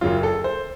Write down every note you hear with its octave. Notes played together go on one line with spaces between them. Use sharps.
F#1 F#2 C#3 F#3 F4
A4
C5